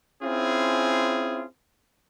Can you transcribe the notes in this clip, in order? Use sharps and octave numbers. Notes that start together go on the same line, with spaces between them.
C4 C#4 E4 F4 G#4